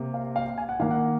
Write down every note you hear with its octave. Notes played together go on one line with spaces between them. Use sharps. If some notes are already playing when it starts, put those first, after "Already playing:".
Already playing: C3 A#3
F5
F5
G#5
F#5
D#3 A#3 F5
F#5